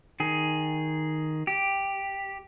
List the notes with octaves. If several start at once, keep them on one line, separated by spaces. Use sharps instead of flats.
D#3 G#4
G4